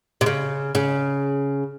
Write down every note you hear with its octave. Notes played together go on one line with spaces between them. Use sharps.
C3
C#3
C#3